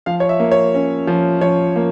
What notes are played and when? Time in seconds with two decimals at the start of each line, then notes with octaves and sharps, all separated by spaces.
0.06 F3 F5
0.20 C#5
0.29 E5
0.40 A#3
0.52 C#5
0.74 C#4
1.07 F3
1.41 F3 C#5
1.76 A#3